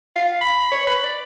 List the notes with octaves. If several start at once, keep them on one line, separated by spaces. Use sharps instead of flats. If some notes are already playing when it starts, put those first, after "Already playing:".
F5
B5
C#5
B5
D5